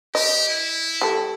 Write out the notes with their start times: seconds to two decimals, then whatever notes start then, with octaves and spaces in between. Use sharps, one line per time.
0.15 G4 D#5
0.49 E4
1.01 G3 A4